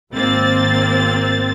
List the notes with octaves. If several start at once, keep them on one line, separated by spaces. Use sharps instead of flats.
G#1 A#3 C4 A6